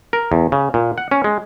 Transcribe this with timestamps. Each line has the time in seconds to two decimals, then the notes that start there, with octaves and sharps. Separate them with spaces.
0.13 A#4
0.32 E2
0.52 C#3
0.74 A#2
0.98 F#5
1.11 C#4
1.24 G#3